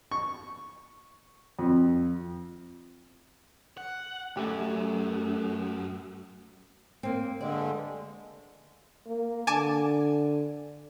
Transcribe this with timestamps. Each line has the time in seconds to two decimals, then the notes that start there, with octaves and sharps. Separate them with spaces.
0.11 C#6
1.59 F2
3.77 F#5
4.37 F#2 A3 G4
7.03 A#3 C4
7.41 G2 D3 G#3 D5
9.07 A#3
9.47 D3 G#5 A5 D6